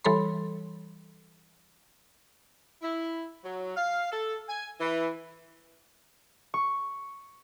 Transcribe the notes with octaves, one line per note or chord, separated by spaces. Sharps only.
E3 G3 A4 C#5 B5 C6
E4
F#3
F5
A4
G#5
E3
C#6